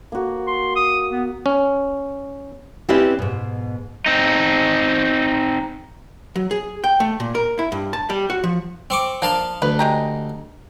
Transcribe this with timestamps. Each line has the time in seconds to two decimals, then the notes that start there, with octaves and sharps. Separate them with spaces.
0.12 A#3 F#4
0.47 C6
0.75 D#6
1.11 B3
1.46 C#4
2.89 C4 C#4 E4 G4 B4 D5
3.19 G#2 B2
4.06 C4 D#4
6.36 F#3
6.51 G#4
6.84 G5
7.00 A3
7.20 A#2
7.35 A#4
7.59 E4
7.72 G2
7.93 A5
8.10 G3
8.30 F#4
8.44 F3
8.90 C4 C#6 D6
9.22 F3 A#3 D4 F5 A5
9.62 D2 B4
9.79 G#3 G4 A#5